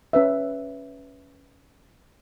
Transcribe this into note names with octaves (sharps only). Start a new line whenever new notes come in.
C#4 B4 E5